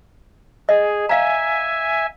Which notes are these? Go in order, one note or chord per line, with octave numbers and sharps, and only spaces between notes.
G#4 D#5
E5 F5 G#5 A#5